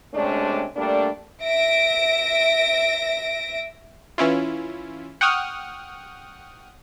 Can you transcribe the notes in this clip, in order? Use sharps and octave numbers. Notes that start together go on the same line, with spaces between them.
C3 G#3 A3 C#4 D4
G3 A3 A#3 D4
E5 A#6 D7
E3 C#4 E4 F4
F#5 G5 C#6 D#6 F6